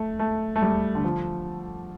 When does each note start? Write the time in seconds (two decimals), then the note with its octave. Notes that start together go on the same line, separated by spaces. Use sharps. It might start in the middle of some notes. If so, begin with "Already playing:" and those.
Already playing: A3
0.19 A3
0.56 A3
0.62 G3
0.95 D3
1.04 F3